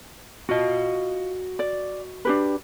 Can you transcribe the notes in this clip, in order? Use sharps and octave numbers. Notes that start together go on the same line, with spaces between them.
F4 F#4 D#5
D5
D4 G4 B4